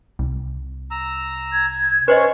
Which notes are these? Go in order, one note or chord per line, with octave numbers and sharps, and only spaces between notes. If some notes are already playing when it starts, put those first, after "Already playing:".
C2
A#5 E6
G#6
C#4 B4 C5 D#5 C6 C#6